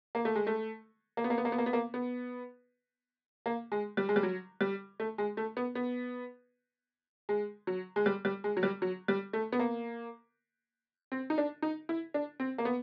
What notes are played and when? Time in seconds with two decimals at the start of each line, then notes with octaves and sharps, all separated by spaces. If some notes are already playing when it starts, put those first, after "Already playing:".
0.15 A#3
0.25 A3
0.35 G#3
0.47 A3
1.17 A#3
1.24 B3
1.30 A#3
1.38 B3
1.45 A#3
1.52 B3
1.58 A#3
1.66 B3
1.73 A#3
1.94 B3
3.46 A#3
3.72 G#3
3.97 G3
4.09 G#3
4.16 G3
4.23 F#3
4.61 G3
5.00 A3
5.18 G#3
5.37 A3
5.57 B3
5.75 B3
7.29 G#3
7.67 F#3
7.96 G#3
8.06 G3
8.25 G3
8.44 G#3
8.57 F#3
8.63 G3
8.82 F#3
9.08 G3
9.33 A3
9.53 B3
9.59 A#3
11.12 C4
11.30 D#4
11.38 D4
11.62 D#4
11.89 E4
12.14 D4
12.40 C4
12.58 A#3
12.65 B3